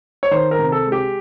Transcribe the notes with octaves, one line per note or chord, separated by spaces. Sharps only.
C#5
D#3 C5
A#4
C3
A4
G#3
G4